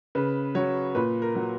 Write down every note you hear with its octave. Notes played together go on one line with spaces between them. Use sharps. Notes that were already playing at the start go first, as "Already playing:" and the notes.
C#3 B4
F#3 C#5
A#2 B4
A#4
F#3